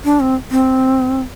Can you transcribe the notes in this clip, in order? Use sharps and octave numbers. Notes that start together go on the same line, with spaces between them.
D4
C4
C4